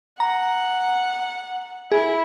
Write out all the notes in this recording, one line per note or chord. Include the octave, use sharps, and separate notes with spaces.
F#5 A#5
E4 G#4